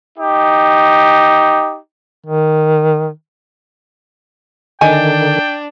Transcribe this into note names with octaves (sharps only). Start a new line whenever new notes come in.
D#4 G4
D#3
D3 D#3 D4 D#4 G5 G#5